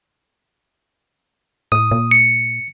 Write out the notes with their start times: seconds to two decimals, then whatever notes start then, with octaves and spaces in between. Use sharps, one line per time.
1.72 A2 D#6
1.91 A#2
2.11 C#7